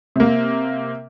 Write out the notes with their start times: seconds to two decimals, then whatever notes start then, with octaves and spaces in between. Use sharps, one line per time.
0.16 C3 A#3